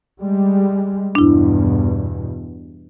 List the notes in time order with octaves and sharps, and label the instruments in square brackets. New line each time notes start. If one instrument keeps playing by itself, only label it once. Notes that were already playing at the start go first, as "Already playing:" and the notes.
[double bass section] G3 G#3
[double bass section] E2 G2 B2 [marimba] D4 E4